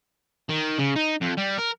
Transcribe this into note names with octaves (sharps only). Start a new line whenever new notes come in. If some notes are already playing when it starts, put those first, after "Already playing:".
D#3
C#3
D#4
F2
G3
A#4